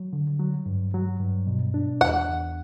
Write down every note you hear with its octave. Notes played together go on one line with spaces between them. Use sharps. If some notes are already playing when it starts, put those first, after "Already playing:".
Already playing: F#3
D3
F#3
G2
F#3
G2
B2
D4
E2 F#5
E2